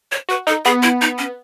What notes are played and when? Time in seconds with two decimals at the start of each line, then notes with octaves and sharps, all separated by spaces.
0.12 C#5
0.29 F#4 B4
0.47 D#4 A4
0.65 B3 G#4
0.83 E4
1.02 D#4
1.18 C#4